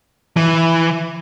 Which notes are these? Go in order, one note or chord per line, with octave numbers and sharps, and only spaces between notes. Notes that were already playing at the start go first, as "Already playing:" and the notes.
E3